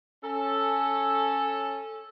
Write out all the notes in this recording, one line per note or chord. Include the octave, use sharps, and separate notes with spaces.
C#4 A4